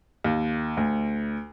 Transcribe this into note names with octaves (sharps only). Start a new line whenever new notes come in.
D#2
D2